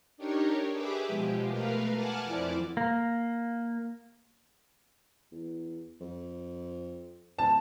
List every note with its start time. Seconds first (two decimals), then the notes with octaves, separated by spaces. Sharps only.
0.17 D4 D#4 G4 A#4 C#5
0.73 G4 G#4 B4 E5 D6
1.07 B2 F3 G#3 G4
1.48 A3 A#4 B4 F5
1.94 F#5 G#5 A5 D6 F6 F#6
2.24 F2 F3 E4 D5
2.77 A#3
5.32 E2
6.01 F2
7.39 D1 A5